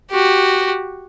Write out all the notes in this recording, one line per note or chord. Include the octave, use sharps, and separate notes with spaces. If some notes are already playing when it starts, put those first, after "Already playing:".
F#4 G4